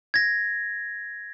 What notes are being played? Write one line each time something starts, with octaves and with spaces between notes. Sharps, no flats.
G#6 A#6